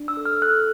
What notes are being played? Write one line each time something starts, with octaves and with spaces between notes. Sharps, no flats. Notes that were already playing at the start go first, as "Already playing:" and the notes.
Already playing: D4
E6
A4
F6
A4 F#6